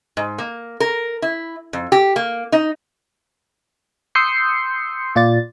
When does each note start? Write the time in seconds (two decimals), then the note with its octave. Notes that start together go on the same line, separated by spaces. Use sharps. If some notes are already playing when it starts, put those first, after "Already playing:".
0.17 G#2
0.38 A#3
0.80 A#4
1.22 E4
1.73 F2
1.92 G4
2.16 A#3
2.52 D#4
4.15 C6 D#6 E6 G6 C7 C#7
5.15 A#2 F4 D5 A6